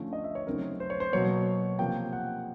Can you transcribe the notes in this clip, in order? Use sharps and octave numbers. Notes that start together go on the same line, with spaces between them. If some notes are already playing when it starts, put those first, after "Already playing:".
Already playing: D3 F3 A3 C#4
D#5
E5
C#5
C#3 F#3 A3 C4 D#4 A#4
C5
C#5
C5
B2 F#3 A#3 C#5
C3 F3 A#3 G5
F#5